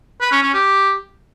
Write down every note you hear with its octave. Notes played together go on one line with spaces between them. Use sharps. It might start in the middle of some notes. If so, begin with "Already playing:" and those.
B4
C#4
C#4
G4